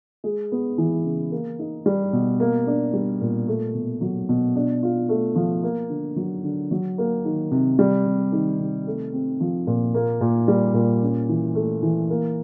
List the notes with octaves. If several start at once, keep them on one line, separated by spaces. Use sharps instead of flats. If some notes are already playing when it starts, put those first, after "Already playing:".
G#3
B3
E3
C#3
A#3
D#4
G3
B2
A#3
D4
G3
A#2
A3
B2
F#3
B2
D4
F4
A3
F3
A#3
D3
F#3
D3
F#3
A#3
D#3
C3
G3
C3
D#3
C3
A3
C4
F3
A#2
A#3
A#2
G3
A#2
C#4
E3
A3
E3
A#3